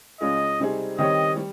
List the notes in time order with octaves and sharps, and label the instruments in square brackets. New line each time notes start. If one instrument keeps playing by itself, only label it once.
[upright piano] C#2 C#3 G#3 C#4 F4 [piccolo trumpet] D#5
[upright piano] C3 G3 C4 D#4 G#4
[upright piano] D#3 G3 C4 G4 C#5 [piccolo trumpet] D#5
[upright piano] G3